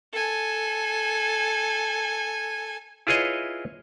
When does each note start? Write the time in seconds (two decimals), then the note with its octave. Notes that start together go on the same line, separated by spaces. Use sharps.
0.13 A4 G#5
3.07 E4 F4 G#4 B4 C#5 D#5